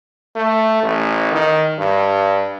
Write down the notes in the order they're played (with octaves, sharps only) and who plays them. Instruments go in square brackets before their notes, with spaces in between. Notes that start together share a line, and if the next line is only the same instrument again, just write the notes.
[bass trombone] A3
A1
D#3
G2